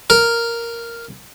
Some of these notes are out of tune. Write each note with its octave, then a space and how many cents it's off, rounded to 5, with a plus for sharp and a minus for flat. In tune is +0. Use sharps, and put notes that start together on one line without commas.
A#4 +0